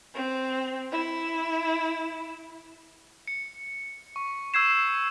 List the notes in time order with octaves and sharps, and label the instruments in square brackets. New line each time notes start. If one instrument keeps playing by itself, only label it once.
[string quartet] C4
E4
[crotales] C#7
C#6
C#6 E6 G6 G#6 C7 E7